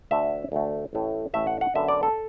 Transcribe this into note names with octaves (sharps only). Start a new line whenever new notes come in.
D2 D3 A3 E5
D2 D3 A3
A1 A2 A3
A1 A2 A3 E5
F#5
F#5
F#2 D3 B3 E5
D5
A4